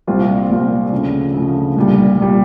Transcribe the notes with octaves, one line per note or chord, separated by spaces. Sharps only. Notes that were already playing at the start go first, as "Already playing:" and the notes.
C2 A#2 G3 C4 F4
C2 A#2 G3 C4 F4
D2 C#3 F3
D2 C#3 F3
C2 A#2 G3
C2 A#2 G3